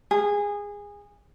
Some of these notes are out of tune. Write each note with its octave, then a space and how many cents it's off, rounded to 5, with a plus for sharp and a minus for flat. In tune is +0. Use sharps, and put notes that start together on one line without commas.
G#4 -20